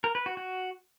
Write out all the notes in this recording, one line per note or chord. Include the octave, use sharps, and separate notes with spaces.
A#4
B4
F#4
F#4